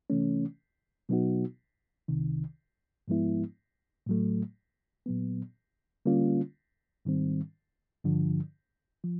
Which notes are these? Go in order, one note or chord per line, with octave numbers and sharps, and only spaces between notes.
C3 E3 A3 C#4
B2 F#3 B3 D#4 F#4
C2 C3 D#3
G#2 F3 G#3 B3 E4
A2 F#3 A3
A#2 F#3 B3
D3 G3 A#3 C#4 F4
G#2 D#3 G3 C4
G2 D3 F3
F3